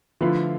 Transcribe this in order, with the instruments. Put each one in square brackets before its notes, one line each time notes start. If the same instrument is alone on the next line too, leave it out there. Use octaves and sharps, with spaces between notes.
[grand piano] D3 A3 E4 B4 F5 [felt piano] F3